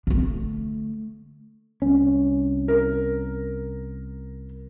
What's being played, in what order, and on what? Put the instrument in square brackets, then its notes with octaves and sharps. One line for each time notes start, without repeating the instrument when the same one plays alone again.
[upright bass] D3 A3
[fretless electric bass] C2 C#4
[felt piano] A#4